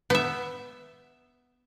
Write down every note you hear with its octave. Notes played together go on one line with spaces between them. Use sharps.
B3 E5